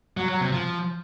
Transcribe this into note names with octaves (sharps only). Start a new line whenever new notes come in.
F#3
F#3
C3
F3